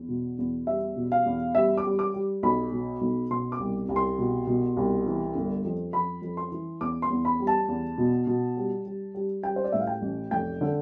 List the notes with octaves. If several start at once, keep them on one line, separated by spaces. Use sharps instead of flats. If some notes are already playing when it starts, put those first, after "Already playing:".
Already playing: E2
B2
E2
G3 E5
B2
F5
E2
G3 E5
D6
G3
D6
G3
B1 B5
B2
B1
B2 C6
D6
C2
C2
C6
B2
B2
C2
E3
G1
F2
F2 B5
F2
C6
E3
E2 D6
C6
E2
B5
G3
A5
E2
B2
B2
G3
G3
G3
G3 G5
C5
D5
A2 E5
F5
G5
A1
F1 G5
D3